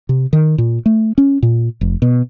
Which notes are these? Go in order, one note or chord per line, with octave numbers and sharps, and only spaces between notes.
C3
D#3
A#2
A3
C#4
A#2
F1
B2